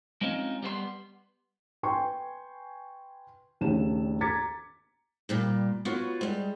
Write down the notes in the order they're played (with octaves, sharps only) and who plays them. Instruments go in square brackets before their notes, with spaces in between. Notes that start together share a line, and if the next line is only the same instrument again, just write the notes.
[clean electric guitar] G#3 C4 C#4 D#4 F4
G3 B3 C5 C6
[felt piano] B4 G5 G#5 C6 C#6
A#1 D#2 C#3 A3 E7
A#5 D6 G#6 A6 B6 C#7
[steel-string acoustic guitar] G2 A#2 G3
B3 F4 F#4 B4 C#5
G3 G#3